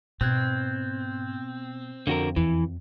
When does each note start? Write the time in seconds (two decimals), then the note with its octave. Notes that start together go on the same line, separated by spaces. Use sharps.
0.21 G#2 B2 C4 F#6 G#6
2.07 F2 D3 F#4 A#4
2.36 E2 E3